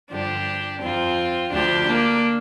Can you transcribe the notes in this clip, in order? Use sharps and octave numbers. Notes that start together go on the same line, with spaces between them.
G2 D3 F3 D4 G4
F2 F3 C4 F4
D2 D3 F3 D4 G4
A#3 D4